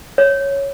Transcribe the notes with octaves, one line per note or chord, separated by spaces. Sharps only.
C#5